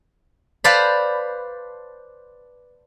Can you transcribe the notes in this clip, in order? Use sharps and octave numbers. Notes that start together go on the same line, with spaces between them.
B4 C5 D5 F5 A5 B5